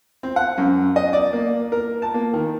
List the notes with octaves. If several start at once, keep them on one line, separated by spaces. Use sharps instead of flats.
C4
F#5
F#2
D#5
D5
A#3
A#4
A5
A#3
D#3